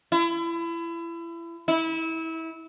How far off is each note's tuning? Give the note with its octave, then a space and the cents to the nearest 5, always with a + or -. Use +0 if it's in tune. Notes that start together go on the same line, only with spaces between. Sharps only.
E4 +30
E4 -25